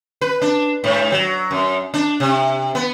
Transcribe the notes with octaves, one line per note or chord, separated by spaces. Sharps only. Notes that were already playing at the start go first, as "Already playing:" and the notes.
B4
D4
G#2
F#3
F#2
D4
C3
B3